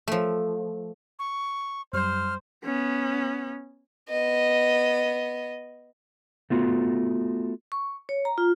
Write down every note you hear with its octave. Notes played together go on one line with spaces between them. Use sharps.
F3 A3
C#6
F#2 G3 C5 F6
B3 C#4
B3 D#5
A3 B3 F4 F#4
C#6
C#5
A#5
F4